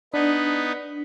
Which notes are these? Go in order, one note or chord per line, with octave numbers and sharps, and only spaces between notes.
B3 D4 D#4 B4